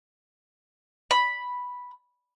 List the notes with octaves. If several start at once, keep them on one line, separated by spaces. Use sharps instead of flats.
B5